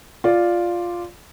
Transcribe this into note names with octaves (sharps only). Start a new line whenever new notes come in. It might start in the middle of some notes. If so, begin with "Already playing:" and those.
F4 D5